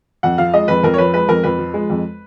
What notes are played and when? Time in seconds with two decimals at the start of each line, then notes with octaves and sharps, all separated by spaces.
0.23 F2 F#5
0.38 F3 F5
0.54 G#3 D#5
0.68 F2 B4
0.83 F2 A#4
0.94 C#5
0.98 F3 B4
1.14 G#3 B4
1.29 F2 A#4
1.43 F2 B4
1.59 F3
1.74 G#3
1.90 F2